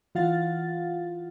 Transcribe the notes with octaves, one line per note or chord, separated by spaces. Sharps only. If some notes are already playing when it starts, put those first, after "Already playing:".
E3 F4 F5 F#5 A6